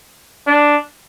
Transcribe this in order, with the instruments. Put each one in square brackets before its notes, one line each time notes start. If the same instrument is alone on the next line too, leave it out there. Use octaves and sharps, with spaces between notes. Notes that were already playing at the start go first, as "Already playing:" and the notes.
[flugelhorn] D4